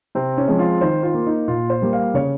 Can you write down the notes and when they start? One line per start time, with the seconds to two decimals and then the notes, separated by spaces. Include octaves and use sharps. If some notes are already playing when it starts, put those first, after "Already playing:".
0.15 C3 C4
0.38 C#4
0.48 F3 G#3 C4
0.59 F4
0.81 D#3 C5
1.03 F4
1.14 A#3
1.26 D#4
1.48 A#2 F4
1.70 C5
1.82 G3 A#3
1.93 F5
2.14 C#3 C#5